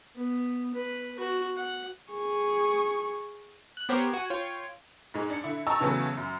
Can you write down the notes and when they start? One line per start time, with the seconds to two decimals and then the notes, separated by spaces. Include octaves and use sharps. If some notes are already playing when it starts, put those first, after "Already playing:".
0.15 B3
0.74 B4
1.19 F#4
1.56 F#5
2.13 G#4 C#6
3.77 F#6
3.89 B3 G4 A#4 C5 C#5
4.14 F#4 G#5
4.30 F4 C#5 G5
5.14 G#2 G#3
5.30 D4 C#7
5.44 D3 E4
5.67 D#5 G5 A5 A#5 C#6 E6
5.80 E2 C#3 E3 F#3 A3 B3
6.17 F#2